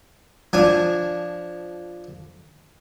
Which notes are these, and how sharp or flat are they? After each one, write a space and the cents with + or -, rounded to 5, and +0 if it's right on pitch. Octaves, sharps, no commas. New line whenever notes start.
F3 +0 D4 +0 G#5 -15